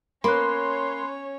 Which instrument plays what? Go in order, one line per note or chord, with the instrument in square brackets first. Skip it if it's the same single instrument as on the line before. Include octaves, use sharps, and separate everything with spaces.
[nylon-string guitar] A#3 [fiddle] C#4 C#5 [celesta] B5 F#6 [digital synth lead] C6